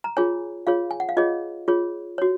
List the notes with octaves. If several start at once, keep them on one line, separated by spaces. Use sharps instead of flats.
A#5
F4 G#4 C#5 G#5
F4 G#4 C#5 F5
G#5
F#5
F5
F4 G#4 C#5 D#5
F4 G#4 C#5
F#4 C#5